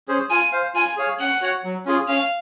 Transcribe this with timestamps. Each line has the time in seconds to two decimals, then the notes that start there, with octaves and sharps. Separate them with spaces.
0.08 C#4 G#4 C5
0.30 F4 G#5
0.52 C5 F5
0.75 F4 G#5
0.96 G#4 C#5 F5
1.19 C#4 F#5
1.41 F#4 C#5
1.64 F#3
1.85 C#4 F4 G#4
2.08 C#4 F5